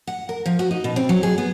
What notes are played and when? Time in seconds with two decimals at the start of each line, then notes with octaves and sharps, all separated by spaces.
0.07 F#5
0.29 A#4
0.46 F3
0.59 F#4
0.71 D#4
0.84 B2
0.96 C4
1.09 F#3
1.23 G#4
1.38 B3